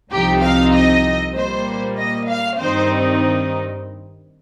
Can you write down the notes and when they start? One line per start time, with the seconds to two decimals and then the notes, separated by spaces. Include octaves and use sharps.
0.11 C2 C3 F3 C4 D#4 G4
0.43 F5
0.73 D#5
1.35 A#2 G3 A#3 C5
1.98 D#5
2.28 F5
2.59 G2 D#3 G3 C4 D#4 C5